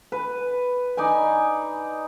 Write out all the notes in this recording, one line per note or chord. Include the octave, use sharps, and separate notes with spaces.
B4
D#4 D5 G#5